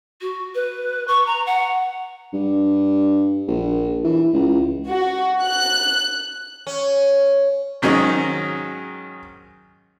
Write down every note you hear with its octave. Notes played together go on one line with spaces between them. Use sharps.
F#4
B4
C#6
A#5
F#5
G2
A#1
E3
C#2
F#4
F#6
C#4
G#2 D#3 F#3 C#4 G#4 D#5